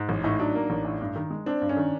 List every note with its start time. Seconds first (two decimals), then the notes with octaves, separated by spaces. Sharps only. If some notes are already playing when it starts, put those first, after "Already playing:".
Already playing: G#2
0.09 A1
0.24 A2 D#4
0.40 F#3 D4
0.55 A#3
0.70 A1
0.85 A2
1.01 G2
1.16 D#3
1.31 G#3
1.46 C4 D4
1.62 G2
1.69 C#4
1.77 D#3